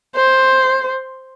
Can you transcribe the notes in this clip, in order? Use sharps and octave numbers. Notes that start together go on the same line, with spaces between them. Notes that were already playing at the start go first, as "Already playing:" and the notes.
C5